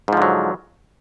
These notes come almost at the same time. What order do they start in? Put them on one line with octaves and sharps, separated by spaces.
G#2 F3 D3 F#3